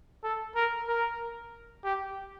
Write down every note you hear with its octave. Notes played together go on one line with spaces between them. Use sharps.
A4
A#4
A#4
G4